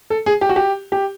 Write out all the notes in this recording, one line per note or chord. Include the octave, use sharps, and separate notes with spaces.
A4
G#4
G4
F#4
G4
G4